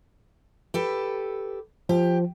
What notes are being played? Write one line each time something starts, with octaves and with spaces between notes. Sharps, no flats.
G4 A4 B4
F3 G4